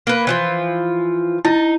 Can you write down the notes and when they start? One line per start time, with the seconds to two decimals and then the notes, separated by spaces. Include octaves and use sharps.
0.07 A#3 B4
0.27 E3 F3 F4
1.45 D#4 E4